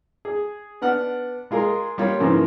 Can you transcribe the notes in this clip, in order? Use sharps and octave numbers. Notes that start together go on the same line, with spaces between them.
G#4
B3 D4 F#5 F6
G#3 F4 G#4 A#4
G3 A#3 F4 C#5
G#2 C#3 E3 F3 A#3